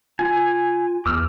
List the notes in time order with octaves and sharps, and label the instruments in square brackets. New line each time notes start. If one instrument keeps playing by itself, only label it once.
[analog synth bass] F4 [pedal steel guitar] G#5
[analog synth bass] E2 [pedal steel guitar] D6 E6 F6